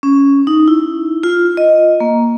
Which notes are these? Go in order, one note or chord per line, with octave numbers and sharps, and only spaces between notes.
C#4
D#4
E4
F4
D#5
A#3